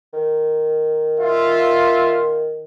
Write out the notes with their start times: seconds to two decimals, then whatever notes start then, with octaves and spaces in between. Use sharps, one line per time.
0.13 D#3
1.20 F4 E5